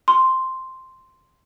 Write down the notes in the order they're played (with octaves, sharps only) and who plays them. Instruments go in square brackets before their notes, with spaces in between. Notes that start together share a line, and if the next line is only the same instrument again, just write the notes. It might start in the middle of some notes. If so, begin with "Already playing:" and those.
[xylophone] C6